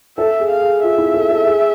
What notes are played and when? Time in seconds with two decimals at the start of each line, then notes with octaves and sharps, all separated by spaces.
0.18 A4 E5
0.40 G#4
0.51 F5
0.61 G#4
0.83 F4 E5
0.98 E4
1.14 A4
1.30 A4
1.47 G#4